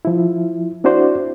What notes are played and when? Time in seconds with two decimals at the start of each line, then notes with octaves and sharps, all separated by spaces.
0.05 F3 E4
0.84 C4 D4 E4 F#4 C5 D5